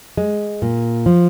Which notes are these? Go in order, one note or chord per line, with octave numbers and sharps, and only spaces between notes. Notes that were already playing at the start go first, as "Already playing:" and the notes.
G#3
A#2
F3